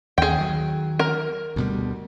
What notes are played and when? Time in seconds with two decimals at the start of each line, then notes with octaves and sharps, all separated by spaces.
0.18 D#2 G#4 G5
0.38 D#3 F#3
0.99 A#4
1.56 D2 B2 G3